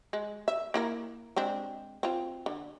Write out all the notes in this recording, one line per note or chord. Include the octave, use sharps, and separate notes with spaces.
G#3
E5
A#3 E4 A#4
G#3 C4 D4
C4 F4
D3